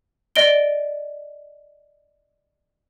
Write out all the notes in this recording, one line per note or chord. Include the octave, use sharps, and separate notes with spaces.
D5 D#5 D7 G7